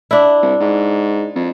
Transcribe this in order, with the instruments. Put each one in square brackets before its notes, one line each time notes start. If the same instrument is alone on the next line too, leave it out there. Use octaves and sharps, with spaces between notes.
[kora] D4 E4
[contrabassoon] C2
G#2
F2